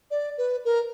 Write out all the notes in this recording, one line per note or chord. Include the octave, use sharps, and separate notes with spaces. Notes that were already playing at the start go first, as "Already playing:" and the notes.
D5
B4
A#4